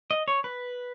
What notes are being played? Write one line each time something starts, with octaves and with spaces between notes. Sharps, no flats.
D#5
C#5
B4